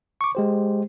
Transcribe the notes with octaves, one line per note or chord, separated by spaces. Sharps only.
C#6 D6
G#3 G4 C5